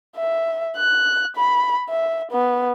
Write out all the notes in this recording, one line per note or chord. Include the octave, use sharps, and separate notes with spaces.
E5
F#6
B5
E5
B3